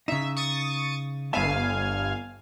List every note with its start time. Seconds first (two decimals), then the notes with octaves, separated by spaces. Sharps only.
0.08 C#3 D#4 E5
0.37 C#6 D#6 A6
1.33 G1 B3 E5 F5 G#5 A5